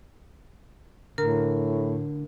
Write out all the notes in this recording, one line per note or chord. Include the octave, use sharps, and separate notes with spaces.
A2 D3 A#4 A#5 F6